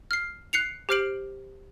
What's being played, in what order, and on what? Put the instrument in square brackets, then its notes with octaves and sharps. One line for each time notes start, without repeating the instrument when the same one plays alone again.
[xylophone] F6 C7
F#6 C7 C#7 F7
G4 C5 F6 C7 D7 F#7